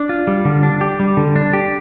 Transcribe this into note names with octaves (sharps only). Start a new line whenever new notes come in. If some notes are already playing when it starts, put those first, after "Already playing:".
Already playing: D4
F4
G3
D3
D4
G4
G3
D3
D4
G4